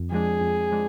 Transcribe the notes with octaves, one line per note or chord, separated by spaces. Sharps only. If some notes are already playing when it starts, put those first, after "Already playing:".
Already playing: F2
F3 G#3 D4 G#4
F2
F3 G#3 D4